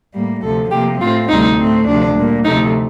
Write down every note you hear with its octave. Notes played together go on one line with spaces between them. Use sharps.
A2 G3 A#3
D2 C3 F3 A4
C3 F3 A#3 G4
A2 A3 C4 F4
D2 C3 G3 C4 D#4
A2 A3 C4
D2 C3 F3 D4
A#2 G3 A#3
D2 C3 F3 A3 D#4